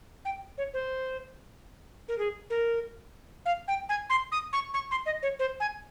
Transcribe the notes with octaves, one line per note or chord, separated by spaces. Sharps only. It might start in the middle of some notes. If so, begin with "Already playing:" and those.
G5
C#5
C5
A#4
G#4
A#4
F5
G5
G#5
C6
D#6
C#6
C#6
C6
D#5
C#5
C5
G#5